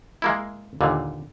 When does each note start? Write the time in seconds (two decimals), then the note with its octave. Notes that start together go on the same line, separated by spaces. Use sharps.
0.22 G#3 A#3 E4
0.81 D#2 A#2 D3